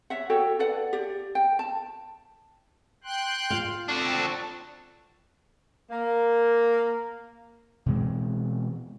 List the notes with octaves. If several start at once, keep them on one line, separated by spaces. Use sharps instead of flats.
C#5 E5 F#5
F#4 A4 C#5 G5
A4 B4 D5 F#5
G4 D5
G5
A5
G5 C6 F#6
F4 F5
C4 D4 F#4 A4 A5
A#3
B2 E3 G#3 C4